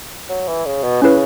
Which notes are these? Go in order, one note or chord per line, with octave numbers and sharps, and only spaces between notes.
F#3
E3
C#3
B2
C#3 C#4 E4 B4